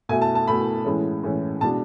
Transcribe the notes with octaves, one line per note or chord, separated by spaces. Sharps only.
B2 A3 E4 G#5
A5
A5
B2 A3 E4 B5
A2 E3 G#3 C#4
A2 E3 G#3 C#4
B2 G#3 D4 A5